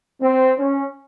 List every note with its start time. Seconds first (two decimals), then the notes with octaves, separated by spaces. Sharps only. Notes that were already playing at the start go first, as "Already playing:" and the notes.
0.21 C4
0.58 C#4